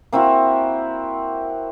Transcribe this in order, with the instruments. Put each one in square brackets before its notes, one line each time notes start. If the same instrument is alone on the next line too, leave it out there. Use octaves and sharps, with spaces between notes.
[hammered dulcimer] A#3 C4 E4 F#4